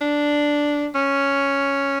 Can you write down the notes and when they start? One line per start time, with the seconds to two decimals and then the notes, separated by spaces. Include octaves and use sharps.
0.01 D4
0.95 C#4